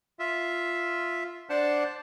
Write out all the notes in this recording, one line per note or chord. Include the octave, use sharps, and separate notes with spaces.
F4 E5
D4 C5 D5 F#5 A5